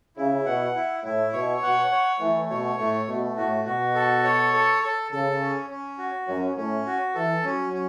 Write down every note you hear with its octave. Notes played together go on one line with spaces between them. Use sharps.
C#3 E4
B2 F#5
E4
A2 E4
B2 C#5
B2 F#5
C#5
E3 A3
B2 C#5
A2 A3
B2 A3
A2 F#4
B2 F#4
A4
C#5
A4
A4
C#3 A4
C#4
C#4
F#4
F#2 C#4
A2 C#4
F#4
E3 A4
F#3 C#4
C#4